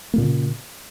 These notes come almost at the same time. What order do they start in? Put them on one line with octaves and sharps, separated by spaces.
A#3 A#2 C#3